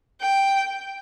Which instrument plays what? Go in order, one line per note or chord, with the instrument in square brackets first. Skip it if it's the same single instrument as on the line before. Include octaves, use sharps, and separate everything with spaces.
[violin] G5